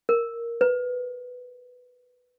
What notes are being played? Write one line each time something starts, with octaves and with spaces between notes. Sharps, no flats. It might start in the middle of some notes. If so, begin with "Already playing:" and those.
A#4
B4